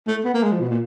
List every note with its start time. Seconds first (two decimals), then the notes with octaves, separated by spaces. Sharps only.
0.07 A3
0.24 B3
0.34 A#3
0.43 G#3
0.52 F3
0.60 B2
0.69 A#2